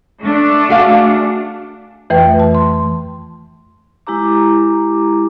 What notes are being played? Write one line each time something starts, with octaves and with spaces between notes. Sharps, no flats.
A3 D4
F#4 G#4 F5
F2 E3 A3 B4 G5
A5
C6
G#3 E4 G4 A#5 D6